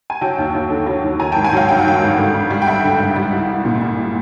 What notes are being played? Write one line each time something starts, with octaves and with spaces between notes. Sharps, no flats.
G#5
F#3 G5 A5
D#2
D#2
D3
F#3
D#2
D#3 G#5 A#5
G#1 G5 A5
F#5 G#5
F#3 F5 G5
G2 G5
F#5
D#3 F5 G5
G#1
D3
G#1
G3
G5
G2 E5 F#5
D3
G#1
G3
C2
C2
A#2
G3